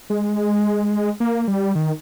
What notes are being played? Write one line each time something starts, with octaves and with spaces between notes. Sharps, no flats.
G#3
A#3
G3
D#3